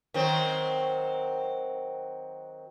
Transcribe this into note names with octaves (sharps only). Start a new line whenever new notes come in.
D#3 F#3 C4